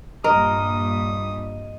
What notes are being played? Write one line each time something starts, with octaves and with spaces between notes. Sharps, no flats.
G2 A#2 A#4 D#5 D#6